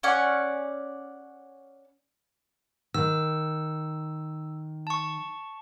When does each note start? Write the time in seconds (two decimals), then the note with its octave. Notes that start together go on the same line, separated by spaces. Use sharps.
0.03 C#4 D5 F#5 G#5
2.94 D#3 E6
4.87 A5 C#6